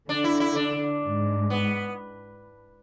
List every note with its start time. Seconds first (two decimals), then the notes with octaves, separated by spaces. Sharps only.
0.09 D3 D4
0.24 E4
0.40 E4
0.56 D4
1.03 G#2
1.50 B3